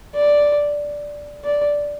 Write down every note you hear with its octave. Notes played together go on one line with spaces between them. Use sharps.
D5
D5